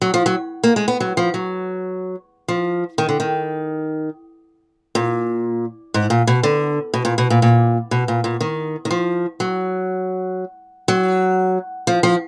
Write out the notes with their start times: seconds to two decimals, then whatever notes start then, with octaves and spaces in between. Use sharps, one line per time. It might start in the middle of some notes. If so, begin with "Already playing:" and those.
0.02 F#3
0.14 F3
0.26 F#3
0.64 A#3
0.76 G#3
0.88 B3
1.00 F#3
1.17 F3
1.34 F#3
2.48 F3
2.98 D#3
3.09 D3
3.20 D#3
4.95 A#2
5.94 G#2
6.10 A#2
6.27 B2
6.43 D3
6.94 B2
7.05 A#2
7.18 B2
7.30 A#2
7.42 A#2
7.91 B2
8.08 A#2
8.24 A#2
8.41 D#3
8.85 D#3
8.91 F3
9.40 F#3
10.88 F#3
11.87 F3
12.03 F3